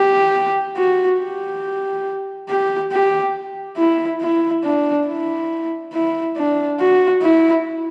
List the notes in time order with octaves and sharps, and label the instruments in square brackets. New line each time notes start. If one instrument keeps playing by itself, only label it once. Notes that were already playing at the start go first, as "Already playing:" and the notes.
Already playing: [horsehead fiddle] G4
F#4
G4
G4
G4
E4
E4
D4
E4
E4
D4
F#4
E4